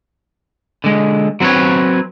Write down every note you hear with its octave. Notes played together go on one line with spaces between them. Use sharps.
D3 G#3
F#3 C4 A4 B4 C#5